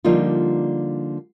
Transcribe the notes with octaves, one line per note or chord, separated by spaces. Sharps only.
D3 F3 G3 A#3 D#4 F4